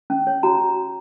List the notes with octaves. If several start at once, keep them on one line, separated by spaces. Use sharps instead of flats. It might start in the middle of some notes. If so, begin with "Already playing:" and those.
C#4
C#5
F#4 A#5